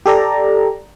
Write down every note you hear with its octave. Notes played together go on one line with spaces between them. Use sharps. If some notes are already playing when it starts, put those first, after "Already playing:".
G4 A4 D5 A#5